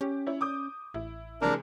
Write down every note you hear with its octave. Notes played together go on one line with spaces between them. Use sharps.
C#4 G4
E4 C#5
D6 D#6 G6
A1 E4
C3 E3 G#3 D4 A#4